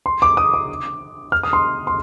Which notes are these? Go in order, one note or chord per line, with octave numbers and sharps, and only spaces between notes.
C6
D6
D#6
D6
F6
D#6
C6
C6